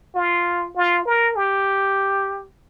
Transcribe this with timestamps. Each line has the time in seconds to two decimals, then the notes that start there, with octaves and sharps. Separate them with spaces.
0.15 F4
0.76 F4
1.06 A#4
1.36 G4